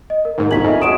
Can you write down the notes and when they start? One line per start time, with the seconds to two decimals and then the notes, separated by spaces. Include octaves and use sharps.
0.10 D#5
0.25 A#4
0.38 D#2 G#2
0.51 G1 C2 D#4 G#5 A#5 C#6 B6 F#7
0.64 F2 D#5 E5
0.81 F#3 G#3 F#4 D#6 D7 E7